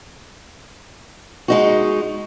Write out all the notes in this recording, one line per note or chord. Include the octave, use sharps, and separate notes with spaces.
G#3 D#4 F#4